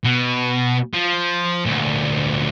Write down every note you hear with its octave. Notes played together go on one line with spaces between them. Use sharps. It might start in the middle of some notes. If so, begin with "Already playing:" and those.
B2
F3
D2 A#2